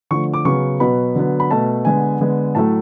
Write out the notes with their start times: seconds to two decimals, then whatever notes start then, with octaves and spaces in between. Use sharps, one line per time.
0.11 D3 F3 A3 C#6
0.34 D6
0.45 C#3 F#3 B3 C#6
0.80 B2 F#3 B3 B5
1.15 D3 F#3 B3
1.40 B5
1.51 B2 A3 A5
1.85 D3 G#3 B3 G#5
2.20 D3 G#3 B3
2.55 A2 F#3 A3 A5